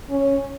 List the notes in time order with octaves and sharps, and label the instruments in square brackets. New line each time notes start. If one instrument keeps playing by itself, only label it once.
[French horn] C#4